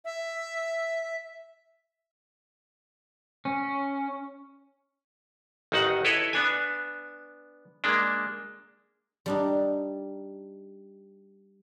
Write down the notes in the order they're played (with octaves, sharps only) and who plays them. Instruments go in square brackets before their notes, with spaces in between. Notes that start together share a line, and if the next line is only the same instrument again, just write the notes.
[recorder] E5
[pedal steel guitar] C#4
[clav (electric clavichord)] A1 D#3 D#4 F#4 F#5
E4 A4 B4 C#5 D#5
B3 D4 G#5
G#3 A#3 D4
[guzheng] G3 D4 D#4